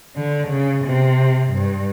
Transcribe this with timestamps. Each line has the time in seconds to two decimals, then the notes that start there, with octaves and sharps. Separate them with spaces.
0.16 D3
0.48 C#3
0.85 C3
1.51 G2